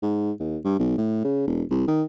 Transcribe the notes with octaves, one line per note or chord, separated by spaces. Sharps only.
G#2
D#2
G2
B1
A2
C#3
E1
C2
D#3